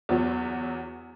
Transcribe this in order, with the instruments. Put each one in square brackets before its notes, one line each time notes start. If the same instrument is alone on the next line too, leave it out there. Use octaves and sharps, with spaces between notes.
[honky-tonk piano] E2 F#3 B3